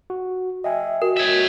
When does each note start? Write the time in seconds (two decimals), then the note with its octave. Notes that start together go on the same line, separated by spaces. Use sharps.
0.10 F#4
0.64 D#5 E5 G5 G#5
1.02 F#4 A#4
1.17 C#5 E5